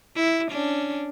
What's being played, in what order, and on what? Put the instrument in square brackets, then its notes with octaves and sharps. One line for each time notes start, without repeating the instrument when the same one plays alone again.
[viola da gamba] E4
C#4 D4